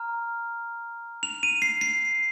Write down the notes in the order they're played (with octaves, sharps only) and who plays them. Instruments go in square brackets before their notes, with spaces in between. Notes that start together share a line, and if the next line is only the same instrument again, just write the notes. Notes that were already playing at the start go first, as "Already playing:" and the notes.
Already playing: [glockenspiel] A#5 F6
F7
D#7
C7
C7